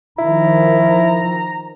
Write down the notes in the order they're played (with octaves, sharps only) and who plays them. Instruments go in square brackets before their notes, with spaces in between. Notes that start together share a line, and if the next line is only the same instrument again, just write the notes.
[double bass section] D#3 F3 [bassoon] E4 [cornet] A#5